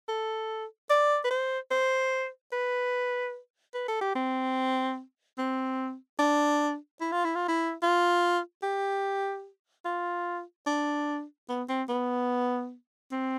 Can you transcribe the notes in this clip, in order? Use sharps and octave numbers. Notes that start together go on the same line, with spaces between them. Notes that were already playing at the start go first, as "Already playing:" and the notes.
A4
D5
B4
C5
C5
B4
B4
A4
G4
C4
C4
D4
E4
F4
E4
F4
E4
F4
G4
F4
D4
B3
C4
B3
C4